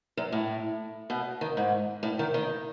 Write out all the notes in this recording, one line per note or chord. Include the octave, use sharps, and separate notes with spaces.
F#2
A2
B2
D#3
G#2
A2
D#3
D#3